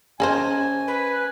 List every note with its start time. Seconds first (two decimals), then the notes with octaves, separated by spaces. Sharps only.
0.20 C#4 G#4 A#4 C5 D#5 G#5 A5
0.87 B4